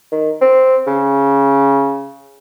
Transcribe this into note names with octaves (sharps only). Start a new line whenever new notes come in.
D#3
C4
C#3